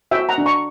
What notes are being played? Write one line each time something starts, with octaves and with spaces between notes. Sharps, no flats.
F#4 E5 G5
F#5 A#5
D4
A#5 C#6